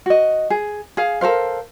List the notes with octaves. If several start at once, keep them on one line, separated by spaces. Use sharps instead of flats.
F#4 D#5
G#4
G#4 F5
A4 A#4 C5 F5